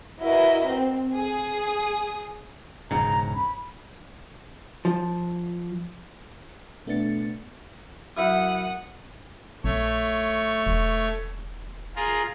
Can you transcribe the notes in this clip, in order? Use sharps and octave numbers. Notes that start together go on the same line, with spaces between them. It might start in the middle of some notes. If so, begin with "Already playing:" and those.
E4 F#4 A#4 B4 D#5
C4
G#4 D#6
E1 G#2 C#3 A#5
B5
F3
B2 A3 B3 D4 A6 C#7
F#2 E4 F#5 D#6
A#1 A3 C#5
E1
F4 G#4 A#4